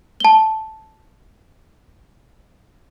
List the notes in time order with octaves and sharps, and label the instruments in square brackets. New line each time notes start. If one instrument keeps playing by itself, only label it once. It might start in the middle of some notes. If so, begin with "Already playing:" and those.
[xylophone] A5 G7